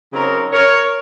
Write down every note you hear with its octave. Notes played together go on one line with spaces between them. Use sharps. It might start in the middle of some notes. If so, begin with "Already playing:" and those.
C#3 F#3 C4 D#4 A#4 C#5
A#4 C#5